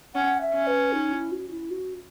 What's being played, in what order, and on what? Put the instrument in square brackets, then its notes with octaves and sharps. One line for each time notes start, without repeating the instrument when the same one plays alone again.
[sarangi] C#4 [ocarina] F#5
[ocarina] E5
[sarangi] C#4
[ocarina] B4
D#4
E4
F#4
E4
F#4